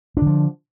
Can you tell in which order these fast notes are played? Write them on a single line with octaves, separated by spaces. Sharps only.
D4 D3 F3